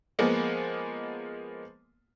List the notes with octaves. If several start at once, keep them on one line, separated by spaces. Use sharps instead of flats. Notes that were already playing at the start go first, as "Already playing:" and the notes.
F3 G#3 A#3 B3